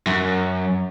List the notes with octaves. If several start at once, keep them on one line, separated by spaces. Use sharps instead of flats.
F#2